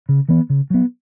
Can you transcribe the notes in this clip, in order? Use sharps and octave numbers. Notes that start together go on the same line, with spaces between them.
C#3
E3 B3
C#3
F#3 B3